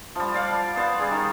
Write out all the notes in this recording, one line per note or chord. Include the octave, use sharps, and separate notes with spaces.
F3 G3
D5 F5 F#5
B3 C5 D5 F5
G3 G#4
D#3